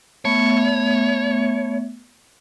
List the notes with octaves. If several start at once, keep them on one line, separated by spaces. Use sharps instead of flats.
A3 B3 C#5 E5